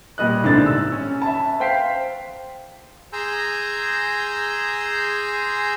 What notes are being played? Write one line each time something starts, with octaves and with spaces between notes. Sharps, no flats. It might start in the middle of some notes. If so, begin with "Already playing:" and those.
A#2 G3 D#5 F#6
C2 G#2 D3 D4 A6
E6
C#4
E5 A5
C5 F5 G5 B6 C7
G#4 G#5 A#5 C6 E6 G6